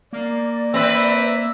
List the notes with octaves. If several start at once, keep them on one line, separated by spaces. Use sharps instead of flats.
A#3 D5
C4 B4 E5